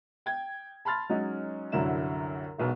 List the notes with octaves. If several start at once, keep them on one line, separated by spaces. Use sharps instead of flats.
G5 G#6
A5 B5 C6 F6 A6
F#3 G#3 C#4 D#4 F#4
C2 F#2 D3 F#3 E4 E7
E1 B1 B2